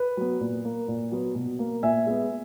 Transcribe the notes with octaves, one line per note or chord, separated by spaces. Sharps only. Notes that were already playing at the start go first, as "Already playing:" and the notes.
Already playing: B4
F#3 B3
A#2
A#3
A#2
F#3 B3
B2
A#3
A#2 E5 G#5
G#3 B3